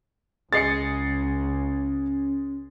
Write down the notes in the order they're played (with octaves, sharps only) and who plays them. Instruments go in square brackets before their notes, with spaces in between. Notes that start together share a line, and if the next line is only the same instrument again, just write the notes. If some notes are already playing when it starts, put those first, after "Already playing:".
[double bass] C#2 [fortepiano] G#3 G#4 D#5 [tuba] C#4 [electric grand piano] A6 C7 C#7